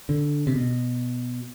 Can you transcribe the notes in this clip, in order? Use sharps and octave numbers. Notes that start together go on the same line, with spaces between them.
D3
C3
B2